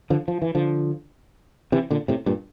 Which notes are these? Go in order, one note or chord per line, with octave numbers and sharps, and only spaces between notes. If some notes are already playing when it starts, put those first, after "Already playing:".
D3 F3
F3
E3
D3 F3
C3 E3
A#2 D3
A2 C3
G2 A#2